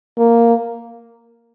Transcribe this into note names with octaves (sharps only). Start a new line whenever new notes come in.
A#3